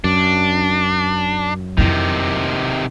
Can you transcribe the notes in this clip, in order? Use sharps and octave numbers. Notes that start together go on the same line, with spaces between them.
F#2 D4
F2 C3 D#3 E3